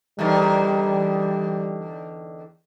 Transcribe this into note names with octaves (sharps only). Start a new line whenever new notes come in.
E2 D3 D#3 G3